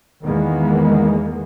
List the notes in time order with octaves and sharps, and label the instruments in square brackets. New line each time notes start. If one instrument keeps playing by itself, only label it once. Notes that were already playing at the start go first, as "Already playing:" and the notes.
[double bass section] E2 D#3 G#3 A#3 B3